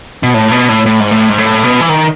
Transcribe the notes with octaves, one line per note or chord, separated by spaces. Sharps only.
B2
A2
B2
A2
A2
G#2
A2
G#2
A2
B2
E3
D#3